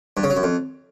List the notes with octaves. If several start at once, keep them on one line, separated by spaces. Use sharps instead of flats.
G2
C#3
F#3
F#2
F2